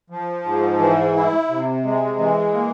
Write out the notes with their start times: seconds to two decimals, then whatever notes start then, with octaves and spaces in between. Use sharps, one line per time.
0.10 F3
0.45 G#2
0.79 E3
1.14 E4
1.49 C3
1.84 G#3
2.19 E3
2.53 A#3